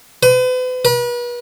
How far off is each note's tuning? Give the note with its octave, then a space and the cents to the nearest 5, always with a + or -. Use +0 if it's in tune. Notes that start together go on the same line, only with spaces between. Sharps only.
B4 +40
B4 -40